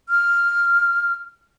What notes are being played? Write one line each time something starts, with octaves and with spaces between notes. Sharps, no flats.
F6